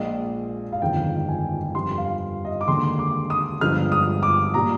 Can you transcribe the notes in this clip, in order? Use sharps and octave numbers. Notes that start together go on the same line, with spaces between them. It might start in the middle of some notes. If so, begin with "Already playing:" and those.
Already playing: A#1 A#2 G#3 D#5
F5
G1 F2 D#3 G#3 G5
G#5
G1 F2 D3 G3 C6
F5
D#5
D6
D#2 D3 G#3 C6
D6
D#6
G1 G2 F3 G#3 F6
D#6
D6
A#2 G3 A#5